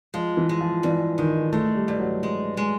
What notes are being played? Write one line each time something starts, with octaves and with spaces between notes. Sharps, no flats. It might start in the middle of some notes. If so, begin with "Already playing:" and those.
F3 G#3
E3
G#3
F3
G2 E3
D#3 G#3
G#3 A3
G3
G2
F#3
G#3
G#3